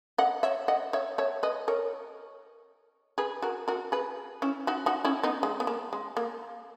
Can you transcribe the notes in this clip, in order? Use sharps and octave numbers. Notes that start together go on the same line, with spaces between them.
D#5 F#5
C#5 E5
D#5 F#5
C#5 E5
C#5 E5
B4 D#5
A#4 C#5
G#4 B4
F#4 A#4
F#4 A#4
G#4 B4
C#4 E4
D#4 F#4
D#4 F#4
C#4 E4
B3 D#4
G#3
B3
A#3
G#3
A#3